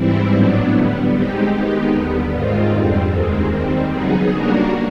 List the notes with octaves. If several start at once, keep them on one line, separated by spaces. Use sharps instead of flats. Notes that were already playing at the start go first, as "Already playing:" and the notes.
Already playing: G#2 E3 G3 C4 E4
A2 F#3 B3 D4
D3 G3 B3
G#3 C4 D#4 G4
D#3 G#3 B3 D#4 G4
D#2 D3 G3 B3
G#2 D#3 G#3 C4 F4
F2 D3 G3 C4
D#2 D#3 G#3 C4
D#3 G3 C4
C#3 F#3 B3 D#4 G#4
G3 A#3 D4 F#4 A#4